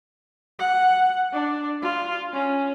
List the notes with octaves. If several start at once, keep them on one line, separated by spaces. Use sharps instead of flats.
F#5
D4
F4
C#4